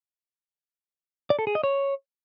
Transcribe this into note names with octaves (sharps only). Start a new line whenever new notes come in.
D5
A4
G#4
D#5
C#5